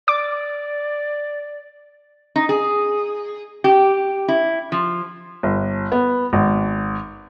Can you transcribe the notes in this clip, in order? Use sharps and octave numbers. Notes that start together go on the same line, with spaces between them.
D5 D6
D#4
G#4
G4
E4
F3
G1
B3
G#1